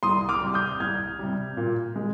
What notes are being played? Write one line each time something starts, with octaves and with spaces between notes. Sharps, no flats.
C2 C6 D#6
D6 F6
C3 G3
D#6 G6
C2 F6 G#6
C3 G3
A#2
G#3